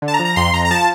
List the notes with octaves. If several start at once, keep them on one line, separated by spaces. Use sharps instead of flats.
D3
A5
A#5
F3
A#5
F2 C6
F2 A#5
A#5
F3 A5